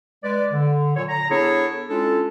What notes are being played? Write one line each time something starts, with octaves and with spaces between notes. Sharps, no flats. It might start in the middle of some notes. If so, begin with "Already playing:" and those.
G#3 B4 D5
D3
A#2 F#3 A4 C#5
A#5
B3 D4 E4 G#4 A4 C#5
G#3 C#4 D4 E4 F4 A4